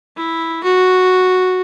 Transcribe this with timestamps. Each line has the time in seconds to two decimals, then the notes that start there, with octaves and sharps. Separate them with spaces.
0.16 E4
0.63 F#4